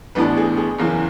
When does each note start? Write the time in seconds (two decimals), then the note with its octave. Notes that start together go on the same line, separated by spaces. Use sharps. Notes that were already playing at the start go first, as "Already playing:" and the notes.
0.15 A1 A2 E3 B3 D4 B4
0.37 G#4
0.57 G#4
0.78 F#1 E2 C#3 E3